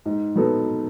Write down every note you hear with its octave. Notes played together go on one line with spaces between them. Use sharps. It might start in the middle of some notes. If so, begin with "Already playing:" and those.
G#2
F#3 B3 D#4 A4